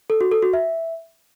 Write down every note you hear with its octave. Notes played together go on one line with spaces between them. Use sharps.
A4
F#4
A4
F#4
E5